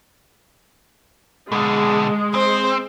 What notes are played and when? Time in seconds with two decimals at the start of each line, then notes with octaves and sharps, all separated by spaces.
1.52 B2 D3 G#3
2.35 C4 C5